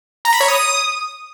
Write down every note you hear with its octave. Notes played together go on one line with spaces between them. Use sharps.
A#5
B5
C#5
D#6